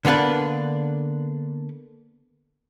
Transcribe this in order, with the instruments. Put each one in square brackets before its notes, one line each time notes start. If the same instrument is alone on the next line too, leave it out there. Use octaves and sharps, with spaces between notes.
[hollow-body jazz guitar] D3 A#3 B3 D4 B4